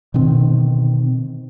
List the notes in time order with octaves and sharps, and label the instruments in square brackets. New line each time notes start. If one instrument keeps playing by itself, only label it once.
[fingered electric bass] B2 D3 D#3 C4